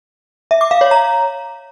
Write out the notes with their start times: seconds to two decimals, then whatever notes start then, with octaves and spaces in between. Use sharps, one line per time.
0.51 E5
0.61 D6
0.71 F5
0.81 C#5
0.91 A#5